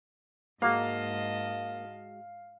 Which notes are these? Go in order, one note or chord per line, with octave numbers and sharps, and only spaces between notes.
G#2 G#3 A#3 F#4 G#4 D#5 F5 A5